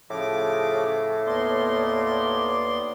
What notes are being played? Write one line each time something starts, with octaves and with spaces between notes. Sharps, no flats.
A2 C#3 F3 D6
D#2 B3 D5 C6